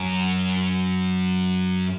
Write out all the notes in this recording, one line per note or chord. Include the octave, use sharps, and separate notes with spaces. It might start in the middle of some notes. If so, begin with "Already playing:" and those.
Already playing: F#2